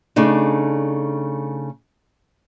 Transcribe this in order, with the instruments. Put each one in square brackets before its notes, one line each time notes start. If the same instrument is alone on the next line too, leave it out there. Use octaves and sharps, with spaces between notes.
[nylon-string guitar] C#3 A3 D4 D#4